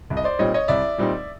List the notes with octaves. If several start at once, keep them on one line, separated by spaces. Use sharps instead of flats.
C2
D#5
C5 D5
A#2 G3 C4 D#4 C#5 D#5
C#5 D#5
C2 D5 E5
A#2 G3 C4 D#4